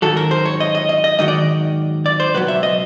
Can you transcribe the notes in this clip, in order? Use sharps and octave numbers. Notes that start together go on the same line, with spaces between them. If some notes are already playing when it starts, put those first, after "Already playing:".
G#2 D#3 F#3 A4
A#4
C5
C#5
D#5
D#5
D#5
D#5
G#2 D#3 F#3 D#5
D5
D5
C5
C#2 B2 F#3 B4
E5
D#5